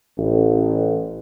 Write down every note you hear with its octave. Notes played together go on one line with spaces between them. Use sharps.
A1